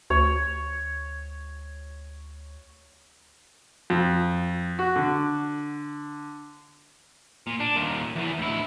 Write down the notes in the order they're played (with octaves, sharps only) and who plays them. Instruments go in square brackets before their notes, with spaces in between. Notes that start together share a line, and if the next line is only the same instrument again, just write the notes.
[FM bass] D2 [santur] C#5
[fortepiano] F2
F#4
D3
[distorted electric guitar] A#2
D4
D#2 A#2
E2 E3
D2 E4